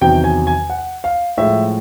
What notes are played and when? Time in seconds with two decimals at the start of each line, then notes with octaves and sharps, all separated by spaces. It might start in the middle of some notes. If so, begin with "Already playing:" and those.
0.01 E2 C3 D#3 F#3 G5
0.24 G#5
0.47 G#5
0.70 F#5
1.04 F5
1.38 A2 F3 G#3 E5